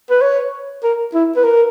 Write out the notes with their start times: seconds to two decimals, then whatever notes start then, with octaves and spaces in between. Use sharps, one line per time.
0.11 B4
0.22 C#5
0.84 A#4
1.14 E4
1.37 B4
1.44 A#4